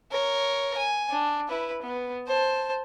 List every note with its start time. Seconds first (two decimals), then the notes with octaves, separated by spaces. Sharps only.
0.11 A#4 C#5
0.77 G#5
1.10 D4
1.48 E4 B4
1.82 B3
2.27 C5 A5